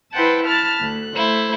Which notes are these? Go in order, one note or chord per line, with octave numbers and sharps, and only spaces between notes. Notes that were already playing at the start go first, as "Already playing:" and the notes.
E4 B4 C5 F#5 G5 A5
A5 B5 F6 F#6 A6
D2 F#6
A3 E4 C5